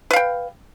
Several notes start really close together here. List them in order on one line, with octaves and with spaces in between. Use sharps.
B4 F5 G5